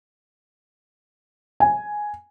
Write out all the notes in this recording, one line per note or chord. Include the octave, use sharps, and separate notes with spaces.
G#5